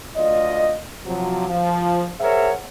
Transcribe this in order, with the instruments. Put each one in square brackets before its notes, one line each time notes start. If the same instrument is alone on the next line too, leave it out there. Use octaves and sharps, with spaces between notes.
[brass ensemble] D2 F4 D5 D#5
C3 F3 F#3
F3
G#4 A#4 C5 C#5 E5 F#5